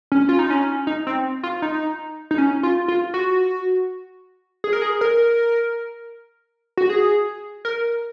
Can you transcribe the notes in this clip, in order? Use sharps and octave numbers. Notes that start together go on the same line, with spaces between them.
C#4
F4
D#4
C#4
D#4
C4
F4
D#4
D#4
C#4
F4
F4
F#4
G#4
A#4
G#4
A#4
F#4
G#4
A#4